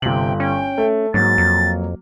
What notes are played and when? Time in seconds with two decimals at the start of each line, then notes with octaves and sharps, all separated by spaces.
0.02 G1 C3 G5 F#7
0.40 C#4 G5
0.78 A3
1.14 G#2 F#3 A#3 A6
1.38 F2